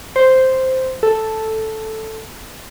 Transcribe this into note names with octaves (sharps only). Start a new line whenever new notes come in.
C5
A4